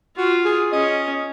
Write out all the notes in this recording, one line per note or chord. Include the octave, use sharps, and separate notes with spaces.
F4 F#4
G#4
C#4 D#5